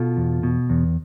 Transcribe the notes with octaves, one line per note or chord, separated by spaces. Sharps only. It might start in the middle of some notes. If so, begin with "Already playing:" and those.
Already playing: B2 F4 A4
E2
B2
E2